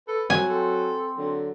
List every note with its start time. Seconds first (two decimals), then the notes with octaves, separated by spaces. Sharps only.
0.08 A4 B4
0.30 F#3 C4 G#5
0.49 C4 A4
1.18 D3 F#3